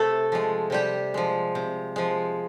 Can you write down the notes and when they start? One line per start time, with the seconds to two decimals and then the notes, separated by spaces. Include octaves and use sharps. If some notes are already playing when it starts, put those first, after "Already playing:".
Already playing: C3 A3 A4
0.32 F3 G#3
0.70 C3 G3 G4
1.14 F3 G#3
1.55 C3
1.96 F3 G#3